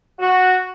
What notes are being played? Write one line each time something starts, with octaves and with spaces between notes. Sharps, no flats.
F#4